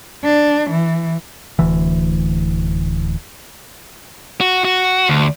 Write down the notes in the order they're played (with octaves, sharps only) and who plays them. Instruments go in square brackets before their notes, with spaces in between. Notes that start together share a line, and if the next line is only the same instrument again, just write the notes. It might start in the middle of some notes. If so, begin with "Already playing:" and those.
[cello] D4
E3
[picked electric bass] D1 D2 E3
[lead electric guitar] F#4
F#4
D2